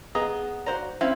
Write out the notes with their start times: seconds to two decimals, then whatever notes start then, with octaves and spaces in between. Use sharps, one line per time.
0.15 B3 G#4 D#5 A#5
0.66 F#4 C5 D5 A#5
1.01 C4 C#4 E4 F5